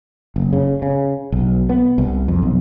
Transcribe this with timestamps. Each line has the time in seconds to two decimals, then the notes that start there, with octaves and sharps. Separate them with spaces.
0.36 F#1
0.53 C#3
0.82 C#3
1.32 B1
1.69 B3
1.98 C2
2.28 F2
2.42 B1